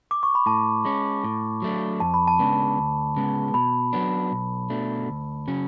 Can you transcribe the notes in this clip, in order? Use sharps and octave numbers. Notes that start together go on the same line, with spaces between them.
D6
C#6
B5
A2 A5
G#3 C#4
A2
F#3 A3 D4
F2 A5
B5
A5
C#3 G#3 B3 D4
D2
C#3 G#3 B3
B2 B5
F#3 B3 D4
B1
B2 A3 D4
D2
C#3 F#3 C#4